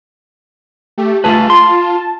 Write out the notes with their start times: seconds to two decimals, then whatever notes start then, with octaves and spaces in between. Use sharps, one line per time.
0.98 A3 G4
1.24 A3 F4 G#4 B4 A5
1.50 C6